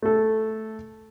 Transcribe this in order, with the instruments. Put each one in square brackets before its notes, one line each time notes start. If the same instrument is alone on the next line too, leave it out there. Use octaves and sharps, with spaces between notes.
[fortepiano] A3 A4